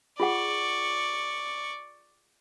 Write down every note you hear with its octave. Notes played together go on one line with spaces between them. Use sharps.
F4 G#4 D5 F#5 C#6